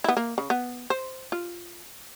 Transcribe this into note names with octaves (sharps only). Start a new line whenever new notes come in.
B3 E4
A#3
C#3
B3
C5
F4